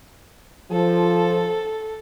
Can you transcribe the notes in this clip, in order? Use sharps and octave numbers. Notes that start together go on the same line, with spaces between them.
F3 A4